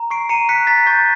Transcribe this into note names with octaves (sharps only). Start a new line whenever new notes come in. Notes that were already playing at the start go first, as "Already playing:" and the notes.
Already playing: A#5
C#6 C7 D7
A#5 C#7 D#7
F#6 B6 C#7
A#5 A6 B6
C#6 G6 A6